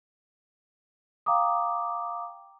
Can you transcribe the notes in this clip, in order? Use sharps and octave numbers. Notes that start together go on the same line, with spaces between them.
F5 G5 A#5 D6 D#6